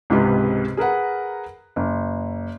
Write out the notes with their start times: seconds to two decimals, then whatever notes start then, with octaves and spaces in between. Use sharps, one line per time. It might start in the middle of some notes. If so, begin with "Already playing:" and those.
0.10 C#2 G#2 C3 G4 B4
0.77 G#4 A#4 B4 F#5
1.76 F#1